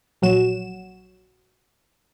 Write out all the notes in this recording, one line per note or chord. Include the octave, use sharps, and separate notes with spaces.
A#1 F#3 F#4 E7